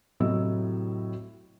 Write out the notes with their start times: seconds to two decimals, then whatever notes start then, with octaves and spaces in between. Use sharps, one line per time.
0.20 A2 C3 F#3 E4 D#5 E6